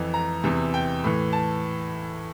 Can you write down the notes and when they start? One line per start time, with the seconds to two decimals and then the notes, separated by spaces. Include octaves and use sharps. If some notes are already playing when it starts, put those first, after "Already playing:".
Already playing: F2 E3
0.14 A#5
0.43 E2 C3 E3
0.74 G5
1.04 A2 E3
1.33 A5